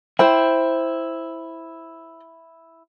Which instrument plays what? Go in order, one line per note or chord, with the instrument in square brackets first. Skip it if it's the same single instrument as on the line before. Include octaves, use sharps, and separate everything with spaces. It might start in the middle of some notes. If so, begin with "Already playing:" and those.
[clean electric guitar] E4 [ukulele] C5 G5